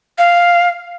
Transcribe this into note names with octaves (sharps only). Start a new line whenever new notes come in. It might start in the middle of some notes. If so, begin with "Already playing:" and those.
F5